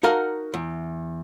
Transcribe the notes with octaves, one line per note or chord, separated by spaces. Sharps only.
D#4 F#4 A#4 F5 F#5 A5
E2